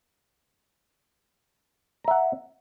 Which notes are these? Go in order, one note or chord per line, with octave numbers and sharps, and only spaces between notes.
E5 F#5 A#5